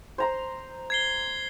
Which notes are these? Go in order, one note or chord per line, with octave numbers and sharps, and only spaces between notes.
C5 A#5 C6
G#6 C7 G7